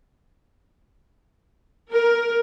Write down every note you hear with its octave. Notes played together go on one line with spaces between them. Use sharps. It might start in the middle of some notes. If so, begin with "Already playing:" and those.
A#4